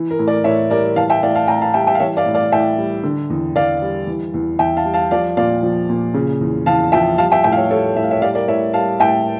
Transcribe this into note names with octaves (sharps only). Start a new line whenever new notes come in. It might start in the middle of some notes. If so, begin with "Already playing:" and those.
Already playing: E3
A#4
A2
A#4 D5
A2 C#5 E5
G3 A#4 D5
E3 F5 A5
E5 G5
A2 D5 F5
F5 A5
A2 G5 A#5
F5 A5
G3 E5 G5
E5 G5
F5
E3 C#5 E5
D5 F5
A2
D5 F5
A2 E5 G5
G3
D3
E2
E2 D5 F5
G3
E3
E2
E2 E5 G5
F5 A5
G3
F5 A5
F3 D5 F5
A#2 D5 F5
F3
A#2
C#3
E2
E2 F5 A5
F3 E5 G5
G3 F5 A5
E5 G5
A2 E5 G5
F5
C#5 E5
G3 A4 C#5
A2 E5
F5
C#5 E5
G3 D5 F5
A#4 D5
A2 C#5 E5
G3 F5 A5
A2 E5 G5